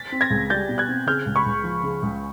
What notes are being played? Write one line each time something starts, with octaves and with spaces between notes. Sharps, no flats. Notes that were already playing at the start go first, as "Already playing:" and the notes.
Already playing: A6 B6
C4
G#6 A#6
C#2
G3 G6 A6
B2
F#6 G#6
C4
C#3 F6 G6
C#2
B5 C#6
C#2
F3
C#3
C#2